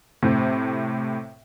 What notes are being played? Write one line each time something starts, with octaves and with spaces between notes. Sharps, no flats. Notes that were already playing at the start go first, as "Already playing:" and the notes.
A2 C3